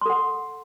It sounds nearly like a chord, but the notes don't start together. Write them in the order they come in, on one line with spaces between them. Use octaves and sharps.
C6 A4 F#5